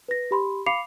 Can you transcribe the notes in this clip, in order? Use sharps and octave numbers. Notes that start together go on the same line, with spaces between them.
B4 A#6
G4 B5 C6
F5 B5 D6 C7 C#7 F7